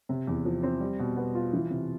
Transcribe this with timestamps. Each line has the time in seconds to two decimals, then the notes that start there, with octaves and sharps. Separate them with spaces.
0.09 C3
0.27 E2
0.45 F3
0.63 C4
0.81 G3
0.99 B2
1.17 B3
1.35 F4
1.53 E3
1.70 C3